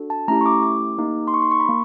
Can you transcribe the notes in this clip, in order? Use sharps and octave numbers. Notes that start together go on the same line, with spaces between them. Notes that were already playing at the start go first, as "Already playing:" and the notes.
Already playing: D4 F#4 A4
A5
A3 C#4 E4 G4 A#5
C#6
D6
D6
A#3 D#4 G4
C6
C#6
C6
C#6
B5
A#3